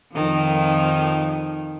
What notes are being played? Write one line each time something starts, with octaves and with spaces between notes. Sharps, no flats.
F2 D#3 F3